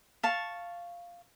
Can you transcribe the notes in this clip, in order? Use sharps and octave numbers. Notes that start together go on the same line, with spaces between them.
F5 A5 C#6